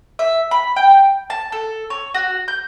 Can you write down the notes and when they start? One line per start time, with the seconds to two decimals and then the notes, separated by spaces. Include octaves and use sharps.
0.19 E5
0.51 B5
0.76 G5
1.30 A5
1.52 A4
1.90 C#5
2.14 F#4
2.48 G6